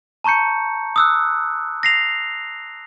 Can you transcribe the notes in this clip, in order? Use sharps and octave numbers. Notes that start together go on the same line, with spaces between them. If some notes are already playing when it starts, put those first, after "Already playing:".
A5 A#5 C#6 G6 C#7
D#6 E6 F#6
A#6 C7 F7